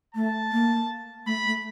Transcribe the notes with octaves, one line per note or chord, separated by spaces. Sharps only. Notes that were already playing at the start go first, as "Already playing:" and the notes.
A3 A5
A#3
A3 B5
A3